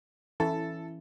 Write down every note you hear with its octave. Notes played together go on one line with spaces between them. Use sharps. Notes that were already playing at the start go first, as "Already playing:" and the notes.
E3 C#4 E4 A4